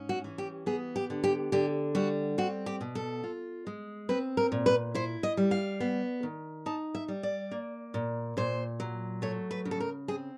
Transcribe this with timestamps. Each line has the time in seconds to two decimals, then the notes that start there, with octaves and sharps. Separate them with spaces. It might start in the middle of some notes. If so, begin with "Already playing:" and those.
Already playing: G#2 C#4
0.09 F#4
0.24 E3
0.38 G4
0.66 B3 G#4
0.96 G4
1.10 D3
1.24 G4
1.52 D3 G4
1.95 G3 F#4
2.38 C4 F#4
2.66 G4
2.81 B2
2.95 A4
3.24 F4
3.67 G#3
4.09 C4 B4
4.37 A#4
4.52 A#2
4.66 B4
4.95 E4 C5
5.23 D#5
5.37 G3
5.51 F5
5.80 B3
6.23 D#3
6.66 D#4 A5
6.95 E5
7.08 G3
7.23 D5
7.51 A#3
7.94 A#2
8.37 A#2 C5
8.80 F#3
9.22 A3 C#5
9.51 B4
9.65 C#3
9.71 A4
9.80 A#4
10.08 C4 G#4